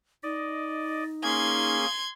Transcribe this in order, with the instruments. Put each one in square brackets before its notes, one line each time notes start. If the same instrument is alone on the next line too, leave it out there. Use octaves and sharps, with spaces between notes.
[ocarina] D#4 [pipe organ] D5 D#5
[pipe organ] A#3 C#4 G#4 [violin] C6 G#6